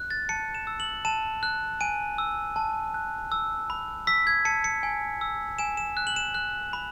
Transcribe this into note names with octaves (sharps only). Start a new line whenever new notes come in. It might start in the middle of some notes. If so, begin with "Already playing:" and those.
Already playing: F#6
A6
A5 C#7
E7
E6
F#7
A5 E7
F#6
G#5 D#7
E6
A5
F#6
E6
B5
E6 B6
G#6
A5 C#7
C#7
G#5
E6
G#5 E7
E7
F#6
F#7
E7
F#6
B5